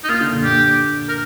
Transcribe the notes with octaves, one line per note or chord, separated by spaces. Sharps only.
D#4
A#3 F4
D3
A#2
A#2 G4
A#4